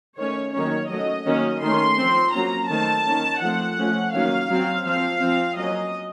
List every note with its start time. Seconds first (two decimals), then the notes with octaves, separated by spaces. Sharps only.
0.18 D#3 A3 C#4 C#5
0.54 D#3 F#3 A#3 C#4 C#5
0.90 F#3 A3 C#4 D#5
1.26 D#3 F#3 A#3 C#4
1.62 D#3 A3 C#4 C6
1.98 F3 C4
2.34 F#3 A#3 C#4 A#5
2.70 D#3 A3 C4 A5
3.06 D#3 A#3 C#4
3.42 F3 A3 C4 F#5
3.78 F3 A3 C#4
4.14 D#3 F#3 A#3 C#4 F5
4.50 F#3 C4
4.85 F3 C4 F5
5.21 F3 C4
5.57 F#3 A#3 C#4 D#5